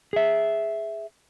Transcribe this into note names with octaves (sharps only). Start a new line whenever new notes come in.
G#4 E5